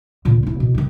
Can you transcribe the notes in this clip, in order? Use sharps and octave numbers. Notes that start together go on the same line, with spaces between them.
D2 A#2
D#1 E4
B2
G2 D#3